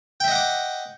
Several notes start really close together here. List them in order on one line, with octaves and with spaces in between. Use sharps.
G5 E5 D#5 F#5 D6